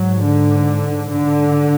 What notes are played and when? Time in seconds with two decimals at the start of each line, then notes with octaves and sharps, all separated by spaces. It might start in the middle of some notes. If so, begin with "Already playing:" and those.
Already playing: G#2 F#3
0.23 D3
1.11 D3